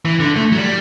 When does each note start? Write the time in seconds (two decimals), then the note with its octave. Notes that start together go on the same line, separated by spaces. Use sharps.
0.05 E3
0.20 D3
0.36 A3
0.52 F#3
0.56 G3